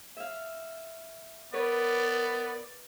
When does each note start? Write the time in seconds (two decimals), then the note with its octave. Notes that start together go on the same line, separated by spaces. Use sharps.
0.17 E5 F5
1.54 B3 A#4 B4 C#5 D5